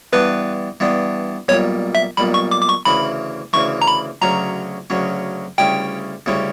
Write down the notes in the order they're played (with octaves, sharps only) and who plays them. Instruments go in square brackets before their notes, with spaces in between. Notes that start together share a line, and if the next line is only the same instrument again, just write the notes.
[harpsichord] G2 E3 B3 D4 [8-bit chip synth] B4
[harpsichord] G2 E3 B3 D4
[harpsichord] B1 A#2 G3 [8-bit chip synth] C#5
[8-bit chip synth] E5
[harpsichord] B1 A#2 G3 [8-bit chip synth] B5
[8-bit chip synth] C#6
D6
D6
C#6
[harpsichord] D2 C#3 E3 [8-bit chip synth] B5
[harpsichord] D2 C#3 E3 [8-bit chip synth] C#6
[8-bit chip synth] A#5
B5
[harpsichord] D2 C#3 F#3 C#4 [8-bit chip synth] A#5
[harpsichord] D2 C#3 F#3 C#4
[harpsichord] D2 C#3 G3 C#4 E4 [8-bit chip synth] G5
[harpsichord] D2 C#3 G3 C#4 E4